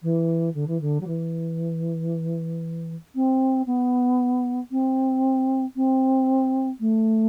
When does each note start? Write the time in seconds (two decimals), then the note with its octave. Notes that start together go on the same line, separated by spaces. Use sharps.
0.02 E3
0.54 D3
0.67 E3
0.81 D3
1.00 F#3
1.07 E3
3.15 C4
3.66 B3
4.71 C4
5.76 C4
6.80 A3